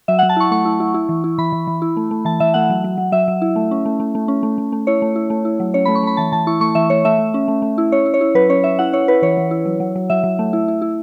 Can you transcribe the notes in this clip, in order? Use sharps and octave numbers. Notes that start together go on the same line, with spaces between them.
F#3 E5
F#5
F#3
A5
E4 C#6
A3 C#6
E4
E4
E4
E3
E4
E3 B5
E3
E3
E4
A3
A3
E3 A5
E3 E5
A3 F#5
F#3
F#3
F#3
F#3 E5
F#3
E4
A3
C#4
A3
A3
A3
C#4
A3
A3
A3
E4 C#5
A3
E4
A3
E4
F#3
C#4 C#5
A3 B5
C#6
A3 B5
E3 A5
E3 A5
E4 C#6
A3 C#6
E3 E5
A3 C#5
A3 E5
A3
C#4
A3
A3
E4
C#4 C#5
E4
C#5
E4
F#3 B4
C#4 C#5
C#4 E5
E4 F#5
E4 C#5
E4 B4
E3 C#5
E3
E4
F#3
F#3
F#3
F#3 E5
F#3
A3
E4
E4
E4